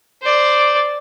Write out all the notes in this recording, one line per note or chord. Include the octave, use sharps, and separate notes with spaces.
C5 D5